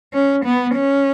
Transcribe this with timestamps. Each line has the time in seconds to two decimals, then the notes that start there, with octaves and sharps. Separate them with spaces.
0.13 C#4
0.45 B3
0.76 C#4